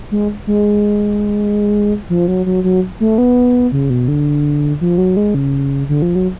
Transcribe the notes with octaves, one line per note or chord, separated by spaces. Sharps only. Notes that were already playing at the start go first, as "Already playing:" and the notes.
G#3
G#3
F3
F#3
F#3
F#3
A3
B3
C#3
B2
D3
F3
F#3
G#3
C#3
D3
F3
F#3